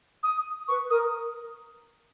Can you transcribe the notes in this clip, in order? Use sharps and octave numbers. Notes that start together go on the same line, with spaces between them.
D#6
B4 C#6
A#4 D#6